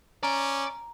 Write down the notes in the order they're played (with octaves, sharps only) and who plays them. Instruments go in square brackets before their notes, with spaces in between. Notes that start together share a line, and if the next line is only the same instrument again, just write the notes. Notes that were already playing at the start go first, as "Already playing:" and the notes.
[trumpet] C#4 [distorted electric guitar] D5 [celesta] A#5